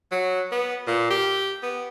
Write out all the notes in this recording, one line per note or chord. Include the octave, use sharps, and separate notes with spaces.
F#3
B3
A#2
G4
B3